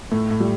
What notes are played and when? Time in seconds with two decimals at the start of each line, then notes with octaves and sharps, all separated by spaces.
0.11 A2 A3
0.31 A2
0.40 G3